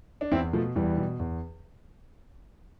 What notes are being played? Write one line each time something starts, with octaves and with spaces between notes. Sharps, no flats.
D4
E2 C4 E4
B2 F3 A3
E2 E3 G3
B2
E2